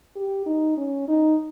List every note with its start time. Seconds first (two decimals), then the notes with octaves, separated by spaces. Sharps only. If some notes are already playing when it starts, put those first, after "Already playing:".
0.16 G4
0.46 D#4
0.77 C#4
1.08 D#4